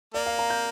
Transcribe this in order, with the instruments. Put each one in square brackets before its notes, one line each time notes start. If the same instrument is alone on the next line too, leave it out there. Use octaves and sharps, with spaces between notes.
[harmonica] A#3 [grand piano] D5
[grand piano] F5
A#5
G6